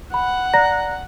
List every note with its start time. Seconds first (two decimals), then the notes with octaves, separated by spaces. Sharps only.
0.14 F#5 B5
0.54 D5 A#5 A#6